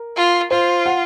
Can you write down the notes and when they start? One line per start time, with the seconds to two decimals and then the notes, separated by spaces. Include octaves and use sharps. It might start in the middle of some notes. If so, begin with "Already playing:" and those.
Already playing: A#4
0.17 F4
0.51 F4 C5
0.86 F#5